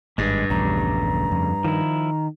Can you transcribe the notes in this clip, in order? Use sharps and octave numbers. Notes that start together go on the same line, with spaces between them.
G#1 G2 G#3
A#1 E2 C#3 G3 A3 A#5
F2
D#3 F3 E4